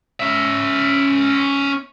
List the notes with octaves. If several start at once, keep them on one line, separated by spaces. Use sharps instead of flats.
C#4 E5